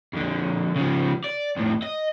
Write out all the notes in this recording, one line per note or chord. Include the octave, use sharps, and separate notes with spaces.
F2 D3
C#3 F3
D5
F2 A2
D#5